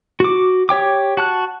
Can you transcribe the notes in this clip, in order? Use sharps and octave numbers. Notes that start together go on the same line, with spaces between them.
F#4 D6
G4 C#5 G5 D6
F#4 A5 F#6